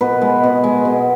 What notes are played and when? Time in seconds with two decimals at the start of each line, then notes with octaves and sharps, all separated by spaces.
0.01 B2 B4
0.22 G#3
0.43 B2
0.64 G#3
0.85 B2